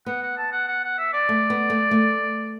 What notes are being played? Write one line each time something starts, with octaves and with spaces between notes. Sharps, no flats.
B3 F#5
F#5
A5
F#5
F#5
F#5
E5
D5
A3
B3
A3
A3